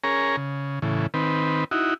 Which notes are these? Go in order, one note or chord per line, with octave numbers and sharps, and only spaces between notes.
C#4 G#4 A#4 C#5 A#5
C#3
A2 C#3 E3
D#3 C4 B4
D#4 E4 F#4